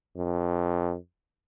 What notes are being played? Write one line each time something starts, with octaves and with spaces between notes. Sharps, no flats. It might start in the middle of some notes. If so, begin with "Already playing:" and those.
F2